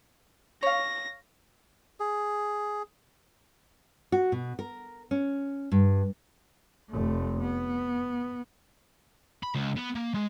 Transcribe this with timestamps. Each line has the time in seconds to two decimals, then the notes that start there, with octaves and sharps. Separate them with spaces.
0.63 C#5 F5 A#6
2.00 G#4
4.12 F#4
4.32 B2
4.59 A#4
5.11 C#4
5.72 G2
6.90 F1 A3
7.40 B3
9.43 B5
9.55 C#2
9.77 B3
9.95 A#3
10.14 G#3